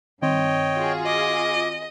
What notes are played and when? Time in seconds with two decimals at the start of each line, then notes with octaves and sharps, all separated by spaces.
0.22 G2 D#3 C4 C#5 D#5 G5
0.74 F4 F#4 G#4
1.06 D#5 D6